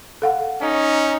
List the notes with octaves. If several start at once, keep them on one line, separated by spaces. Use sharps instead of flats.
A4 F5 F#5
C#4 D#4